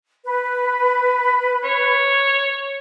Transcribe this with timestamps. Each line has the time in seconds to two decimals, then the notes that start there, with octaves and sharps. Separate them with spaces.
0.24 B4
1.64 C#5